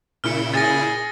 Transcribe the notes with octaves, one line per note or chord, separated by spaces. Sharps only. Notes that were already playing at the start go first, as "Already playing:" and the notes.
A#2 C#3 E4 F6 C#7
G#4 A6 A#6